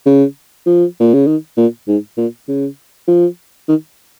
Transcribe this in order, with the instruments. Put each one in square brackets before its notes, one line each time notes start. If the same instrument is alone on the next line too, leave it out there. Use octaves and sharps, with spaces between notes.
[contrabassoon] C#3
F3
A#2
C#3
D#3
A#2
G#2
A#2
C#3
F3
D#3